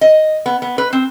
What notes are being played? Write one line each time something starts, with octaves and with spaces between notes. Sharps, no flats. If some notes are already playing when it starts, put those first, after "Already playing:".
D#5
B3
B3
B4
C4